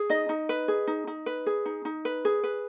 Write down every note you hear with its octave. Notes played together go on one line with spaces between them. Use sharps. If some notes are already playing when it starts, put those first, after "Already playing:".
Already playing: G#4
D#4 D#5
D#4
B4
G#4
D#4
D#4
B4
G#4
D#4
D#4
B4
G#4
B4